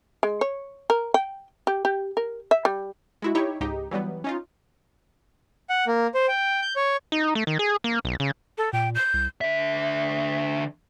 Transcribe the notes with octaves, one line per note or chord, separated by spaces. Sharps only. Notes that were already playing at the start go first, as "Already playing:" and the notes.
G#3
C#5
A#4
G5
G4
G4
A#4
E5
G3
G#3 E4 F#4
D#4 E4 G4 C#5
C#2 G#2 D#4 G4
E3 F#3 G3 B3
C#4 D#4 F4
F#5
A#3
C5
G5
G6
C#5
D#4
A3
D#3
G#4
A#3
B1
C#3
A4
A#2 G5
G6
C2
D3 E5